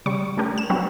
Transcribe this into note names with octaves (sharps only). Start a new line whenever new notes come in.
C#3 G3 C#6
A3 C#4 D4 G4 A#4
E7
F#3 B3 C4 D4 F#4 G4